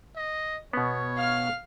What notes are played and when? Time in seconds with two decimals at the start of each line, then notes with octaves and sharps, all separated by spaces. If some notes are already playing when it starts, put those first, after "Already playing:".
0.16 D#5
0.73 B2 B3 C#5
1.17 F5 F6